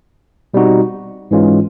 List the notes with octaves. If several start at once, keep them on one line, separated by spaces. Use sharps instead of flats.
B2 G3 C4 D#4 F#4
G#2 E3 G#3 C#4 F4